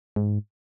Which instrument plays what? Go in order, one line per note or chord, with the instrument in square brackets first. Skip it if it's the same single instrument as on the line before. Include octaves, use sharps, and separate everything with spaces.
[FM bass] G#2